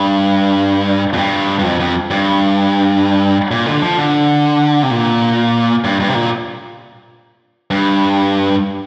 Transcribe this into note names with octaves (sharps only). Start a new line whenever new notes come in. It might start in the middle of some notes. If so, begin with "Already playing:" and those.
Already playing: G2
F2
G2
G2
F2
F2
G2
A#2
D3
F3
D3
C3
A#2
G2
G2
C3
A#2
G2